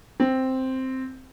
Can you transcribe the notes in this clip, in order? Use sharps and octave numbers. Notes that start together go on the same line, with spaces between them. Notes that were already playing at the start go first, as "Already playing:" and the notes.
C4